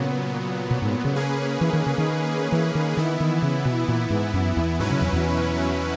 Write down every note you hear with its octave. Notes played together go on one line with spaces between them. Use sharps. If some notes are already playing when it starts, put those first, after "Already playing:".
Already playing: A#2 C#3 F#3 B3
B2
G#2
C#3
A#3 C#4 G#4 B4
E3
D#3
C#3
D#3
E3
D#3
D#3 E3 B3 E4
D#3
C#3
B2
A#2
G#2
F#2
E2
G#2 B2 F#3 C#4 E4 B4
C#3
E2
E2